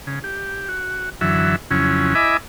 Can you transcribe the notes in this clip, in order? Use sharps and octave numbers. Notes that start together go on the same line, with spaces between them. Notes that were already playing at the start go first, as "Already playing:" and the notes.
C#3
G4
F#4
F#2 D3 E3 F#3 E5
F2 C#3 F#3 C#4 E4
E4 D#5 E5 G#5 B5 D6